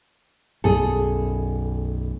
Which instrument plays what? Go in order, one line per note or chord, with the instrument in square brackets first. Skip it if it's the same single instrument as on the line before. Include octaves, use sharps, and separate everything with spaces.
[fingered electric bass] B1 F#2 B2 [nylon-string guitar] G#4 A4